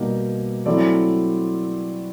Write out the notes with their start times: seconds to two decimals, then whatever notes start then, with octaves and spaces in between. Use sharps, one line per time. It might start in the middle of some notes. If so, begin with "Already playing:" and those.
Already playing: B2 G3 A#3 D#4
0.66 F#3 A3 C4 E4 D5